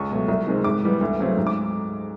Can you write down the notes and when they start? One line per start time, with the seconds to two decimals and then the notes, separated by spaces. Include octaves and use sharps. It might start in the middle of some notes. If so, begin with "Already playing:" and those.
Already playing: C#2 C#6
0.11 B2 F#3 A3
0.28 C2
0.47 C3 D#3 G#3 C4
0.64 G#2 D6
0.83 E3 G3 B3
1.01 D2
1.19 C#3 F#3 A3 C4
1.37 G#2
1.47 D6